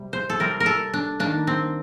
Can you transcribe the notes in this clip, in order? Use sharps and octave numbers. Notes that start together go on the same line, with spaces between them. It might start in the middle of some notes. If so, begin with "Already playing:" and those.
Already playing: C3 G3
C5
A4
C3 G3 C4 A#4
A#4
A4
D4
D#3 A#3 D4
C4